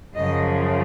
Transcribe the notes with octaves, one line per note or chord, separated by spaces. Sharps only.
F#2 C#3 F3 D#5